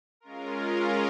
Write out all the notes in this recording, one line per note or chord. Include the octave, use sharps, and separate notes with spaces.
G#3 C#4 F4 A#4